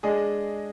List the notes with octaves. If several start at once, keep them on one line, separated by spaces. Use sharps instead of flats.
G#3 D4 G#4 D#5